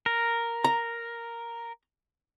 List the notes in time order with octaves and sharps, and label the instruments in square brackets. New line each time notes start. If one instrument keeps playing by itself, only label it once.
[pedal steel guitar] A#4
[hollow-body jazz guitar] A#5